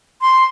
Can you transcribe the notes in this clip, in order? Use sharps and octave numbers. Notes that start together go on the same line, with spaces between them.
C6